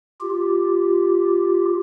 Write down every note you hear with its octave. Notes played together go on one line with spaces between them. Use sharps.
F4 G4